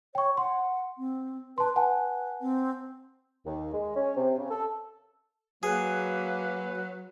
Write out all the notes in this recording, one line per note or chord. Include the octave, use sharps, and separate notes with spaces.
C#5 G5 C#6
F#5 C6
C4
B4 A5 C6
B4 F#5 G#5 A5
C4
D#2
G#3
C#4
C3
C#3
A4
F#3 A#3 G#4 B4